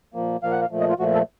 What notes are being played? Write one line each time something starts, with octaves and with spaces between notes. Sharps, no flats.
A#2 F3 A#3
A#2 F3 A#3 F5
F#5
F5
A#2 F3 A3
D#5
F4
A#2 F3 A3 F#4
A4